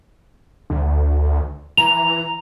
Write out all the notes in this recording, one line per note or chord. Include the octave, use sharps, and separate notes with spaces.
D2
E3 A#5 F7